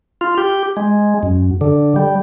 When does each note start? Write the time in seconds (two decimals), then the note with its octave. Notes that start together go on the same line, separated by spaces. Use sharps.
0.21 F4
0.38 G4
0.77 G#3
1.23 F#2
1.61 D3
1.96 G3